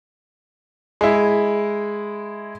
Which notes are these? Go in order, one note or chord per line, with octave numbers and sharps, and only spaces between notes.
G#3 E4